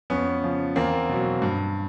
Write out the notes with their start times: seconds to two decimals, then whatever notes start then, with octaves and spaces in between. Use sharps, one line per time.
0.10 F2 B3 C#4
0.43 C#3 F3
0.76 E2 A#3 C4
1.09 B2 F#3
1.42 G2